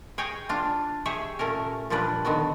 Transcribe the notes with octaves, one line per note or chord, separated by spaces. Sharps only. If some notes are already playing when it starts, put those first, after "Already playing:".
G#4 C#5 G5 G#5 A#5
D4 F4
G4 G#4 C#5 E5
A#2 A3 C#4 A#4
A#2 F3 G3 D4 B4 D5
D3 D#3 F#3 B3